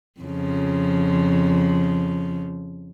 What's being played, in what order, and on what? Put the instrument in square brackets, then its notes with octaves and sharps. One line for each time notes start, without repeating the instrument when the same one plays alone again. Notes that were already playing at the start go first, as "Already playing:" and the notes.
[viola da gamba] F2 C#3 F3